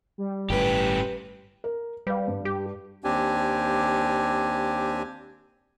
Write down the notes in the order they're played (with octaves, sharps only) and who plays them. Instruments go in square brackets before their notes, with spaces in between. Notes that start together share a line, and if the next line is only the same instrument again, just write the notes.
[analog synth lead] G3
[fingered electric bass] G1 A2 [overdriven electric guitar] C#4 G4 [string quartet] B4
[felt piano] A#4
[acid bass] G3 [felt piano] B4 F5
[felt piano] G2
[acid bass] G4
[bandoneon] D#2 C4 D4 G4 G#5